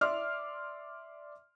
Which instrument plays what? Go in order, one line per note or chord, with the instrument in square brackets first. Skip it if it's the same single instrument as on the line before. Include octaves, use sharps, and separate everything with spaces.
[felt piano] D5 E5 C6 D6 F6